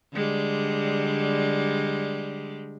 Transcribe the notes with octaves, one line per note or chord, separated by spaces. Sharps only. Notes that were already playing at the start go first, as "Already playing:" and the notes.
D3 G3 G#3